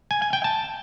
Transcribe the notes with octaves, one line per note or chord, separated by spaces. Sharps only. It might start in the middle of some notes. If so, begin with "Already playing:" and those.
G#5
G#5
G5
A5